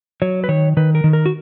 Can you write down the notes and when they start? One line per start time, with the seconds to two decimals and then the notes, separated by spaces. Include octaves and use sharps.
0.22 F#3 C#5
0.44 B4
0.49 D#3 C#5
0.77 D#3 B4
0.95 A#4
1.04 D#3
1.13 A#4
1.26 F#4